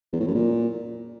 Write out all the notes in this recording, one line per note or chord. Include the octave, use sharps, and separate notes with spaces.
E2
A2
F#2
A#2